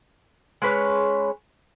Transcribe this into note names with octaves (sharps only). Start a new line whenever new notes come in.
G#3 C#4 B4 C#5